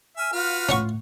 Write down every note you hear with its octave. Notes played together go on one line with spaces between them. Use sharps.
E5 G#5 F6
F4 F#4 B4 F5
A2 A3 C#4 F#5 C#6